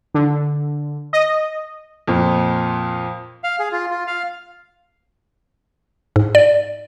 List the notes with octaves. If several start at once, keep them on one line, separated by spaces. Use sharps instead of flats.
D3
D#5
F2 A#2
F5
G#4
F4
F4
F5
G#2
D5